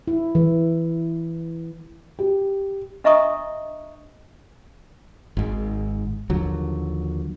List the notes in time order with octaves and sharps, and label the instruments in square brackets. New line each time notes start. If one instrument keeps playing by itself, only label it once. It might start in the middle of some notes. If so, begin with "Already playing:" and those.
[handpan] E4
E3
[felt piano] G4
[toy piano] D4 D#5 E5 A#5 C#6 D#6
[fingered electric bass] G#1 G#2
D#2 D3 F3 F#3